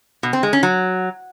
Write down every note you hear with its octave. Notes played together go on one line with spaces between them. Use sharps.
B2
C4
G#3
C#4
F#3